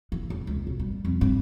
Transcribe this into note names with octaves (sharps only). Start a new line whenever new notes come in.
E3
E2
C#2
B1
G3
F2
G2